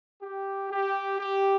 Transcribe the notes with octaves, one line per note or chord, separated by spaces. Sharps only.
G4
G4
G4